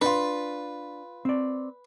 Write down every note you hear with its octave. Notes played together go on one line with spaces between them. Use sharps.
D4 D#4 F4 B4
C4 D5